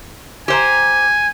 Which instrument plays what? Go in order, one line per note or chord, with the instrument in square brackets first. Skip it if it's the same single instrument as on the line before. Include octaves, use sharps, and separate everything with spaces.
[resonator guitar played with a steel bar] G4 C5 A#5 [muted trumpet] G#5